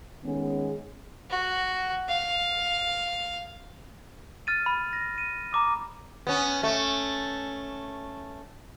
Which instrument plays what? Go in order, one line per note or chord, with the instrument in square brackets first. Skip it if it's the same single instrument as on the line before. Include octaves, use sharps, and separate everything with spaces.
[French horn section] D#3 G#3 B3 C#4 G#4
[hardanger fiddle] F#4
F5
[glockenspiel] F6 A6 D#7
B5
A#6
D#7
A#5 D6 D#6 D#7
[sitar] B3 C#4
A3 C#4